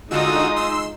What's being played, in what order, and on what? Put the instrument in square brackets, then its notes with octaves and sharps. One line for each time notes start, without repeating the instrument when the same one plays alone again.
[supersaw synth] D3 F#4 E6 [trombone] G#3 [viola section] D#4 [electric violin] F4 D#6
[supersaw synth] C6 E6